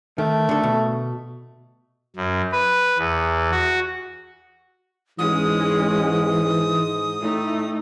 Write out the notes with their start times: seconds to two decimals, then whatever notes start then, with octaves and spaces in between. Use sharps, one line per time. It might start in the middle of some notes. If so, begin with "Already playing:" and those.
0.18 D#3 A3
0.49 D3 A4
0.63 B2
2.16 F#2
2.52 B4
2.98 E2
3.52 F#4
5.19 G#2 E3 G#3 C#4 D#6
7.21 A2 A3 D#4